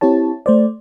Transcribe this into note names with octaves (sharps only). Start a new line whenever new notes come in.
C4 E4 G4 C#5 A5
A3 C5 D5